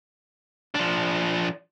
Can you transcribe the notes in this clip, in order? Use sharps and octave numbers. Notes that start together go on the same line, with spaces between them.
F3 D4